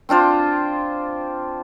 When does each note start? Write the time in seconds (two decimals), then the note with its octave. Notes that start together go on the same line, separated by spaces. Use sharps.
0.09 C4 D4 F4 C5